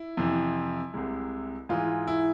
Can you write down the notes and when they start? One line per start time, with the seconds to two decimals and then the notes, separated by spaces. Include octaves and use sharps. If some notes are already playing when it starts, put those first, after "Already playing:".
Already playing: E4
0.17 F2 C3 E3
0.94 C2 C3 G#3
1.69 G#2 E3 G#3 F4
2.07 E4